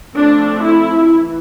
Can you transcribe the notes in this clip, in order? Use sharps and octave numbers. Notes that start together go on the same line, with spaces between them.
F3 A3 C4 D4
E4
E3